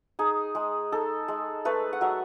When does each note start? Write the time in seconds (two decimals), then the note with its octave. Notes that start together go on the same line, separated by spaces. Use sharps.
0.19 D#4 G#4
0.55 G#3
0.92 D#4 A4
1.28 G#3
1.65 A3 B4
1.93 F#5
2.01 F#3 E5